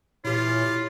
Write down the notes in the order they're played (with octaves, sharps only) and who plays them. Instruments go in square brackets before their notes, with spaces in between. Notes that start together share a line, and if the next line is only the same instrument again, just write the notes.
[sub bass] A#2 [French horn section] E3 C#5 [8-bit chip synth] E4 G4 [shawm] F4